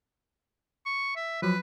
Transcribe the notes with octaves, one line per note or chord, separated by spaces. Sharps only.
C#6
E5
F3 F#3 B4